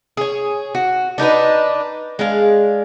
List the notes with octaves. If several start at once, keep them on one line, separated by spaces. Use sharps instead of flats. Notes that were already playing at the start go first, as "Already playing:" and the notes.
G#4 C#5
F#4
D4 D#4 A#4 B4
G#3 D4 F5